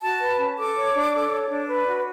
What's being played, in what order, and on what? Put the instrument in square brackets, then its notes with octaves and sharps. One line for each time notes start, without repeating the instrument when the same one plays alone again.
[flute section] F#4 A5
B4
C#4
A4 D6
C#5
D4
A4
C#5
D4
B4
F#4